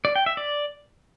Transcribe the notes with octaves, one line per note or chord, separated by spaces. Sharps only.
D5
G5
E5
D5